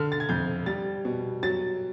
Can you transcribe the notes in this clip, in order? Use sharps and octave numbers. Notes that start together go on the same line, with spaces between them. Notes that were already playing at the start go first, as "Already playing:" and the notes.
Already playing: D3 F6
A6
G#6
F2 G6
G3 A6
B2
F#3 A6